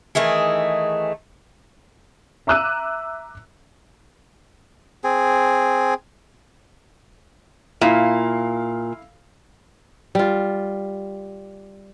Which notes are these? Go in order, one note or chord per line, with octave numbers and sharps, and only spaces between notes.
D#3 E3 A3 G#4
E5 A#5 D6 E6 F#6 D#7
C4 G#4
A#2 E4 F5
G3 F4